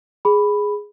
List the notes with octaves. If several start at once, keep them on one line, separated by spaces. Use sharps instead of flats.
G#4 B5